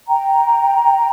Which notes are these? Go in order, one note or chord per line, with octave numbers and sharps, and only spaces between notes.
G5 A#5